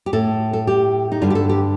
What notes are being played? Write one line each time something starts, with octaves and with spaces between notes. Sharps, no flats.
G4
A2 A4
A4
G4
D#4
G2 D3 F4
G4
A4
G4